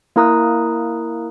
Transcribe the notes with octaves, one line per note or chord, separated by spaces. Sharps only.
A#3 E4 A#4 A#5 D#6 F#6